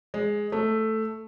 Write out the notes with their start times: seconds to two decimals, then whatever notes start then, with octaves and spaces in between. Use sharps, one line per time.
0.14 G#3
0.52 A3